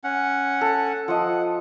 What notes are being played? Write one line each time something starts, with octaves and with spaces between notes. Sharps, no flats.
C#4 F#5
A4
F3 D#5 F#5